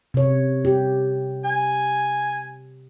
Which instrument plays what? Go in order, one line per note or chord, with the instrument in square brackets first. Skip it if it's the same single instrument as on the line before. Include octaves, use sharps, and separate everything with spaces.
[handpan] C3 C#5
G4
[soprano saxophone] G#5